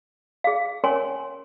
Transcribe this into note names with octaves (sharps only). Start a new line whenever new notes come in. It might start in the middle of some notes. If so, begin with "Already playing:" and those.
G#4 F5
C#4 A#4 C#5 G#5 C6